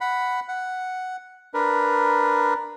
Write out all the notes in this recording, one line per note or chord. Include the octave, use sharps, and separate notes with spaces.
F#5 B5
F#5
D4 A#4 B4